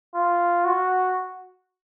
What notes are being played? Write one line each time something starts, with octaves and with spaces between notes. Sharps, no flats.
F4
F#4